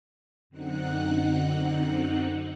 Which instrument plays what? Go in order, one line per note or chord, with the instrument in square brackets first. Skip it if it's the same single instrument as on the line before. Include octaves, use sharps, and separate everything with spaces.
[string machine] F#2 D3 C4 D#4 F#5 F#6